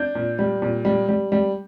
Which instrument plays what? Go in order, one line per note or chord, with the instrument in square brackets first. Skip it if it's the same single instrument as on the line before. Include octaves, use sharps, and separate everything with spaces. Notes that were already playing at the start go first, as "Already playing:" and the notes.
Already playing: [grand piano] D4 G6
A#2
G3
A#2
G3
G3
G3